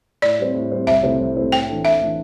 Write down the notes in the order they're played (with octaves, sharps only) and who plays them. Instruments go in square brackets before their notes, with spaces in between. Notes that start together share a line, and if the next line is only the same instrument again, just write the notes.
[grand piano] A2 [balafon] D5
[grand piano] G3 C4
A2
G3 C4
[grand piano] C2 [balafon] E5
[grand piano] C3 A3 C4 E4
C2
C3 A3 C4 E4
[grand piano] A2 [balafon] G5
[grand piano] E3 A3 D4
[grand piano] A2 [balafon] E5
[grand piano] E3 A3 D4